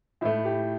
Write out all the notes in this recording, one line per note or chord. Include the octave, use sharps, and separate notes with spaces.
A2 A3 E4
G4